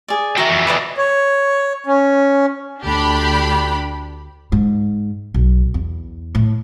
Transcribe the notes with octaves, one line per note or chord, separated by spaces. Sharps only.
G#4 D5
F#4 A#4 E5 G5
F2 E3
B4 D5 D#5
C#5
C#4
D2 D4 G4 B5
G#2
B1
E2
A2